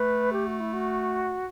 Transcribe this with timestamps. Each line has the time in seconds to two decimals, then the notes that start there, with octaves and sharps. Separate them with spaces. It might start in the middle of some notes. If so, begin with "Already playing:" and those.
Already playing: A3 B4
0.33 G4
0.46 F#4
0.60 E4
0.73 F#4